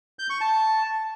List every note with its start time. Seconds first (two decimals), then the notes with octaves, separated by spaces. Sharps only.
0.19 G6
0.30 C#6
0.41 A5